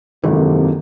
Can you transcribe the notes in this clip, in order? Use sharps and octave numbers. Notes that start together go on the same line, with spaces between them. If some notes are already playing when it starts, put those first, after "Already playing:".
G#1 F#2 C3 D#3 E3 A#3 A4